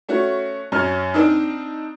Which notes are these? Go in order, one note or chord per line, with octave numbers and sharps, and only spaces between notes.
A3 C#4 F#4
F#2 C#4 F6
C4 D4 D#4